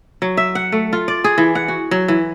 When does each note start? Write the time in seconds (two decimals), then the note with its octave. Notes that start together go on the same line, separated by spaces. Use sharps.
0.22 F#3
0.37 E5
0.55 F#5
0.72 A3
0.93 F4
1.08 D5
1.24 G#4
1.38 E3
1.55 F#5
1.68 F#4
1.91 F#3
2.08 E3